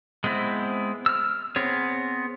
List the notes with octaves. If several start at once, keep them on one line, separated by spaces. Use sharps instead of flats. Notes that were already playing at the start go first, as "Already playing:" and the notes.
G#3 B3 C4 E4
E6 F6
B3 C4 G#4 C#5